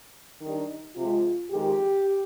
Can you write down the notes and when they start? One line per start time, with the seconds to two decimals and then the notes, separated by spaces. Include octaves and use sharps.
0.41 D#3 G3 D4 D#4
0.96 C3 F3 G#3 F4
1.51 F2 D#3 G#3 G4